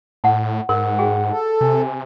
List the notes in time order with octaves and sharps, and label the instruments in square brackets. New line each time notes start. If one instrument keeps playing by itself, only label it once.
[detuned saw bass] A2 [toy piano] F#5 A5
[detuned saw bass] G#2 [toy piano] A#4 C6 [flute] F#5
[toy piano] F#4 G#4 G5
[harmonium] A4
[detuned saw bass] C3 [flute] G#5